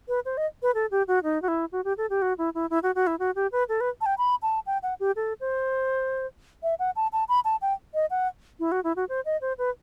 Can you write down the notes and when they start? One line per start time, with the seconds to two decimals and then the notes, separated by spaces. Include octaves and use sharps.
0.08 B4
0.25 C5
0.37 D#5
0.62 B4
0.75 A4
0.91 G4
1.08 F#4
1.24 D#4
1.42 F#4
1.48 E4
1.72 F#4
1.84 G4
1.98 A4
2.10 G4
2.22 F#4
2.38 E4
2.55 E4
2.70 E4
2.83 F#4
2.95 F#4
3.07 E4
3.19 F#4
3.36 G4
3.52 B4
3.69 A4
3.81 B4
4.01 A5
4.06 G5
4.18 B5
4.42 A5
4.66 G5
4.83 F#5
5.00 G4
5.16 A4
5.41 C5
6.63 E5
6.79 F#5
6.96 A5
7.13 A5
7.29 B5
7.45 A5
7.62 G5
7.94 D#5
8.11 F#5
8.60 E4
8.72 F#4
8.84 E4
8.96 F#4
9.09 C5
9.26 D#5
9.41 C5
9.58 B4